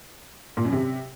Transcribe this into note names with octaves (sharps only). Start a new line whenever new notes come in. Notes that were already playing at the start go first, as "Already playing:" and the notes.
A#2
F#2
C3